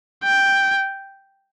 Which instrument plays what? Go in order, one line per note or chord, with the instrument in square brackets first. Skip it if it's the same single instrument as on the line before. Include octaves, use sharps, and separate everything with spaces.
[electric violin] G5